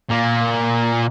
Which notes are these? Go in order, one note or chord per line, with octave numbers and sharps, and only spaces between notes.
A#2 A#3